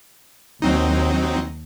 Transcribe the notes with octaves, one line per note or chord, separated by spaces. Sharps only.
D#2 F#3 C4 D#4